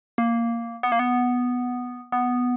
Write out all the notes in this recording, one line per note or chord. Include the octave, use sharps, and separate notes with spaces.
A#3
B3
A#3
B3
B3